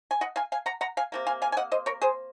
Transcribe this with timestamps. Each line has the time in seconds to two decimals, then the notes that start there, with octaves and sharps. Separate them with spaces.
0.11 G#5
0.21 D#5 F#5
0.36 F5 G#5
0.52 F5 G#5
0.66 F#5 A#5
0.81 F#5 A#5
0.97 F5 G#5
1.12 C3 F3 A#3
1.27 F5 G#5
1.42 F5 G#5
1.52 G#5
1.57 D#5 F#5
1.72 C5 D#5
1.86 A#4 C#5
2.02 G#4 C5